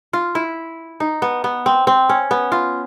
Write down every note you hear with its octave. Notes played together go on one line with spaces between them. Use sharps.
F4
E4
D#4
B3
B3
C4
C4
C#4
B3
F4